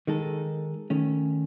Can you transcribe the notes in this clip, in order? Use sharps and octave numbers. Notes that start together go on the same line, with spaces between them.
D#3 G#3 D#4 A4
D#3 A3 C#4